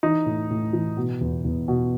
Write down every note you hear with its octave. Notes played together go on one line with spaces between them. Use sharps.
E3 D#4
A2
A2
E3
B2
E2
E2
B2